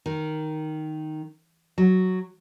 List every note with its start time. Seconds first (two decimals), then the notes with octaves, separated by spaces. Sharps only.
0.06 D#3
1.78 F#3